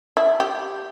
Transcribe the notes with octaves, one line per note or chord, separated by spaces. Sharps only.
E4
G4